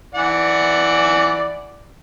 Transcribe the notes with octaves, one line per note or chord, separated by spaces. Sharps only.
E3 D5 F#5